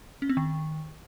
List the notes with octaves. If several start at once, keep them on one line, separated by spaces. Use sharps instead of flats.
C#4
C4
D#3